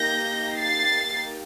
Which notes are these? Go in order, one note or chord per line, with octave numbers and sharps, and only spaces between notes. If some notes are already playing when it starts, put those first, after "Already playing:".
Already playing: A#3 D#4 G4 G6 A#6
A6 C7